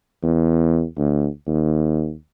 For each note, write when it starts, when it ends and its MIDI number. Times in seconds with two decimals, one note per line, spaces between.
0.23 0.84 40
0.98 1.27 38
1.47 2.14 39